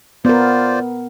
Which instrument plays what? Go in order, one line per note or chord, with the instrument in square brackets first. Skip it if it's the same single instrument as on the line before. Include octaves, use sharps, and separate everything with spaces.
[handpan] B3 A#4 [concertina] F4 C5 D5